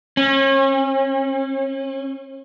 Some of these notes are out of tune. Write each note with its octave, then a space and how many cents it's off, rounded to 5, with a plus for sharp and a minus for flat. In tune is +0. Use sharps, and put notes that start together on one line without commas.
C#4 -40